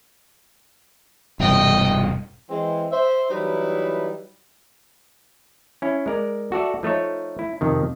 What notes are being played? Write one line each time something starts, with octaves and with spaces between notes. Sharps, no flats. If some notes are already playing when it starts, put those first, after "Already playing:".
E1 G2 C3 D#5 G5
E3 G#3 C4
C5 E5
E3 F#3 G3 D#4 E4 B4
C#4 E4
G#3 A#4 D5
F#4 A4 D5 E5
F3 A3 D#4 C#5
E4
F2 C3 D#3